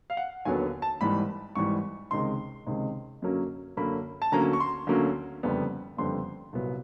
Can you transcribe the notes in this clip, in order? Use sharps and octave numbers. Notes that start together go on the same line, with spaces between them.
F5
F#5
D#2 D3 F#3 B3 G#5
A5
G#1 G#2 E3 G3 B5
G#1 G#2 E3 G3 C#6
C#2 C3 D#3 G#3 C6
C#2 C3 D#3 G#3
F#2 D3 F#3 A#3 C#4
F#2 D3 F#3 A#3 C#4 B5
A5
D2 D3 F#3 A#3 C#4 A#5
C#6
C6
D2 D3 F#3 A#3 C#4
F#1 F2 D3 G3 B3
F#1 F2 D3 G3 B3 C6
C2 A#2 F#3 B3